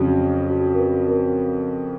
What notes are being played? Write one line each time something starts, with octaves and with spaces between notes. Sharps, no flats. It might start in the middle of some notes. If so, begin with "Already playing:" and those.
Already playing: F2 C#3 F#3 F#4
F#4
A#4
B4
A#4